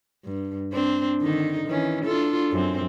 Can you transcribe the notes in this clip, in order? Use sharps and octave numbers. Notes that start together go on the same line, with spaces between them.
G2
C4 D4
D3 D#3 D#4
D#3 E3 C#4
D4 F4 A4
F#2 C4